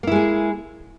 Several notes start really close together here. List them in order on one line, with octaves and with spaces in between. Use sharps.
A#3 E4 G#3 G#4